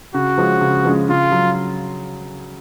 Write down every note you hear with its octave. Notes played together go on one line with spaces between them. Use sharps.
C#3 F#4
F3 G#3 C#4
C#3
F3 G#3 C#4
C#3 F4
F#3